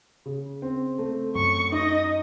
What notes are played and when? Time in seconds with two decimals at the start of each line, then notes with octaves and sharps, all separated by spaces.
0.26 C#3
0.62 C4
0.99 A3
1.35 F#2 C#6
1.72 D#4 D#5